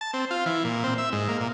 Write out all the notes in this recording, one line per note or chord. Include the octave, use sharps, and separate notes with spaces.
A5
C4
F4
E3
A#2
C4
E5
G#2
A#3
A#2